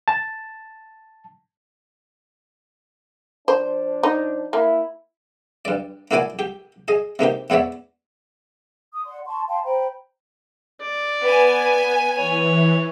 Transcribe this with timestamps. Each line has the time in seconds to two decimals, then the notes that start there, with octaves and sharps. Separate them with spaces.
0.08 A5
3.48 F3 D4 C5
4.03 D#4
4.53 A#3 E4
5.65 G2 D5
6.11 A#3 E4 F#4 D5 G#5 D6
6.39 G4
6.88 G#4 D#5
7.19 C3 A#3 D#4 G4
7.50 E2 B3 C#5 D5 E5
8.93 D#6
9.05 D5 F#5 C6
9.25 A5 C6 C#6
9.49 F5 G5 A5 C6
9.64 C5 G5 A#5 B5
10.81 D5
11.21 B3 G#5
12.17 E3 C#5